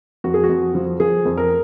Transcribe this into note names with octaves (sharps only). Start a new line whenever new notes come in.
F2 F#4
G#4
F#4
F2
F3
F3 G#4
F2
A#4